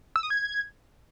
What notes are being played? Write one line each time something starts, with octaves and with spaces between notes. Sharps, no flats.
E6
D#6
G#6